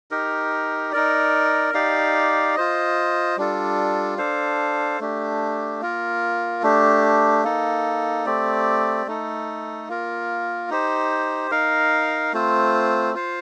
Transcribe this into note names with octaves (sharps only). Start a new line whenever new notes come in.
D#4 G4 A#4
D#4 A#4 D5
D#4 G4 D5 F5
F4 C5 D#5
G3 D4 F4 A4
D4 A4 C5 F5
A3 D4 G4
A#3 F4 A#4
A3 D4 G4
A#3 D#4 A4
A3 C4 G4 D5
A3 D#4 A4
A#3 F4 A#4
D#4 G4 C5
D#4 A#4 F5
A3 C4 F4 C5
F4 C5 F5